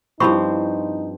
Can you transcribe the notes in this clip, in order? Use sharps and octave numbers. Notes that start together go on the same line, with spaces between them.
G2 F3 C4 D#4 E4 B5 C#6